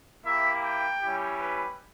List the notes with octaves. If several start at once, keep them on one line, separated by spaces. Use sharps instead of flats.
A#3 E4 G4 E5
G5
G3 C#4 E4 G4
B4